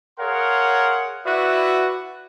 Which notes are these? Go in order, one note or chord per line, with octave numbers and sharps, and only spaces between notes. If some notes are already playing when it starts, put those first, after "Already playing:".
G#4 A#4 C#5 F5 F#5 C6
E4 F#4 B4 D5 E5